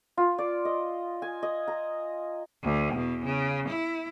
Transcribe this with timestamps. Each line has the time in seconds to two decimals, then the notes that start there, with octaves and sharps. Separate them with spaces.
0.17 F4
0.38 D5
0.65 D#5
1.22 G#5
1.43 D#5
1.68 A#5
2.63 D2
2.93 E2 B2
3.25 C#3
3.68 E4